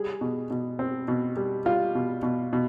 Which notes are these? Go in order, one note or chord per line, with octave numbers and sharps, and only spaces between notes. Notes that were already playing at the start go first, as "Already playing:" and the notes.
Already playing: G3 G#4
B2
B2
C4
B2
G3
G3 F4
B2
B2
B2